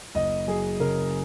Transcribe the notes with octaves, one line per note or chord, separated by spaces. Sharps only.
F#1 D#5
F#3 G#4
C#3 A#4